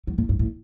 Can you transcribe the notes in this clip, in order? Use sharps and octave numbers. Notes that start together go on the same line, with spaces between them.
F#3
A2
G2
A2